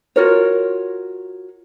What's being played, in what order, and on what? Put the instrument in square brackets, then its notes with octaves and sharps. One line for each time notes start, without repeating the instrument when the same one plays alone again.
[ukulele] F4 F#4 A#4 C#5